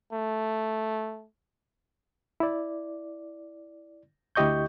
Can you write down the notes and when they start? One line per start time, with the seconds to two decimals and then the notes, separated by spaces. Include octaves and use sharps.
0.13 A3
2.40 E4 D5
4.35 D2 E4 G4 D#5 C#6 G6